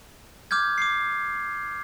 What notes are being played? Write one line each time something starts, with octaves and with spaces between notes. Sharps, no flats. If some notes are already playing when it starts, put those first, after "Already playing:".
D6 F6 G6 G#6
D6 C7